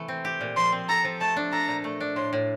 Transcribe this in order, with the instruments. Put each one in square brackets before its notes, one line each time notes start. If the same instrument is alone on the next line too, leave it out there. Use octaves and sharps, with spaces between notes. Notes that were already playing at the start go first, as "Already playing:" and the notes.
Already playing: [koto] C3 E3 A3
C4
G4
A#2
[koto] F3 [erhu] C6
[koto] C4
[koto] A4 [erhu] A#5
[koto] F3
[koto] A3 [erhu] A5
[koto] D4
[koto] A4 [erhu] A#5
[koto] A#2
A3
D4
[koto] A2 [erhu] C6
[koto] A2